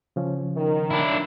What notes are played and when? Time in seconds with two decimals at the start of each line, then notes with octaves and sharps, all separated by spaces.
0.16 C#3 F3 C#4
0.56 D#3
0.90 D4 E4